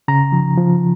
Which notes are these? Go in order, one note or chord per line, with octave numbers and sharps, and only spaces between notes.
C#3 A#5
F3
F3